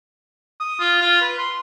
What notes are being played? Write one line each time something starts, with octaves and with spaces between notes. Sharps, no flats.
D#6
F4
F4
B4
C6